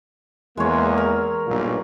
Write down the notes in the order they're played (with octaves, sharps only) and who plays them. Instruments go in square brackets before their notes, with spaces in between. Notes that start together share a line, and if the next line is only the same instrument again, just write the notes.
[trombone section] E2 A#3 [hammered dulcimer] G#3 C#5
[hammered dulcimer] A#4
[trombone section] B1 G2 A#2